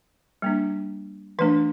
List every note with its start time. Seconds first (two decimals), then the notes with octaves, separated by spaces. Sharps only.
0.42 G3 A#3 D4
1.39 E3 A3 D4 B4